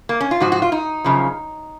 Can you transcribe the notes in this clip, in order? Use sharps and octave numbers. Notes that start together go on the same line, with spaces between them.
A#3
C#4
F4
G#2 F3 F#4
F#4
F4
D#4
F#2 C#3 F3